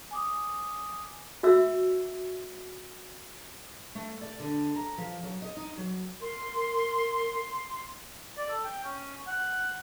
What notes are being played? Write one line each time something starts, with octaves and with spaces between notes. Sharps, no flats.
G#5 D6 D#6
F#4 E5 E6
A3
D5
D3
A#5
F3
F#3
D#5
D#4
F#3
A#4 C6
D5
A4
G5
C#4
F#5